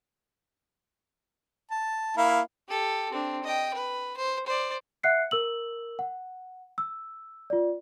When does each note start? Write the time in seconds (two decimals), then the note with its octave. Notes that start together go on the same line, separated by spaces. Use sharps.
1.71 A5
2.17 A#3 E4 F5
2.69 G4 A4
3.12 C4 D4
3.44 D#5 G5
3.74 B4
4.17 C5
4.47 C5 D5
5.03 E5 F#5 F#6 C7 C#7
5.31 A#4 E6 F#7
5.99 F#5
6.78 E6
7.50 F4 D5